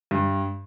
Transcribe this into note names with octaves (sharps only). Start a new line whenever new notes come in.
G2